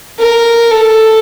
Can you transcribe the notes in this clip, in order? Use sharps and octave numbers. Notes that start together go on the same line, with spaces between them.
A#4
A4